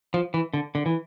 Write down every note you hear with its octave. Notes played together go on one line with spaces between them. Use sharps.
F3
E3
D3
D3
E3